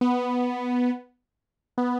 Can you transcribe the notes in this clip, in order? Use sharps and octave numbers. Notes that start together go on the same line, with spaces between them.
B3
B3